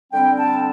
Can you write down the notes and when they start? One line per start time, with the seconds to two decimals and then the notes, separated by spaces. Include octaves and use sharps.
0.11 D3 G3 C4 G5
0.38 A5